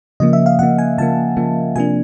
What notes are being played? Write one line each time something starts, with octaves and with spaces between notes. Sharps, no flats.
C#3 F3 A#3 D#5
E5
F5
C#3 F3 A#3 F#5
G#5
C#3 F3 A#3 A5
C#3 F3 A#3
C3 F3 A#3 D4 G#5